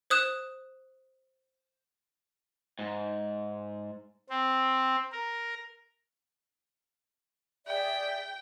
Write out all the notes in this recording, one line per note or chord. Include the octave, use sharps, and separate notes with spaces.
C5 D#6 F#6 E7
G#2
C4
A#4
G#4 D5 E5 G5